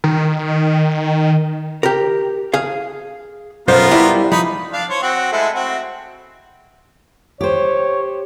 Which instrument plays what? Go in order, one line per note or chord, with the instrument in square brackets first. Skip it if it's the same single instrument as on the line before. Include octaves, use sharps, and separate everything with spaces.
[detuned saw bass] D#3
[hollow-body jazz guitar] G4 A#4
G#4 F5
[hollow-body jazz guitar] B1 F#2 C5 [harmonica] B3 F4 A#4
[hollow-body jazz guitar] G3 E4
[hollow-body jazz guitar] F3 [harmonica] D#4 B5
[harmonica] D4 F5
C5 C#5
C4 F#4 F#5
G#3 A3 E4
C4 F#4
[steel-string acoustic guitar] G4 C5 [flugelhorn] C#5